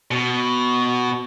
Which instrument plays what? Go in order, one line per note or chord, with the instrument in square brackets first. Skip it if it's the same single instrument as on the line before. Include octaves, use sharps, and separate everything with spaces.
[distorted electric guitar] B2